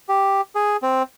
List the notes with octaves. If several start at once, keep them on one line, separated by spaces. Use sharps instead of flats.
G4
G#4
C4